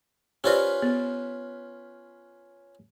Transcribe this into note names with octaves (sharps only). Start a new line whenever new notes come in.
C#4 F4 G4 B4 C5 D5
B3